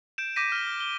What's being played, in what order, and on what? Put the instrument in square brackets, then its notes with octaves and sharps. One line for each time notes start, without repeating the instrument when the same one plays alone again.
[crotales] G6 D7 E7
D6 G6 A#6 B6 D#7
F6 G7
F6
G7